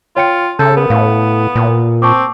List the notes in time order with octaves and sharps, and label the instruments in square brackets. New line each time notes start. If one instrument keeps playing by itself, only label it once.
[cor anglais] F4 [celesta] C#5 G5 C#7
[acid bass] C#3 [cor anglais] A4 [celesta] G6
[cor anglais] B3 [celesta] A#4
[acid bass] A2 [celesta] F5
[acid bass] A#2
[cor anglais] C4 [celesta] A5 C#6 D6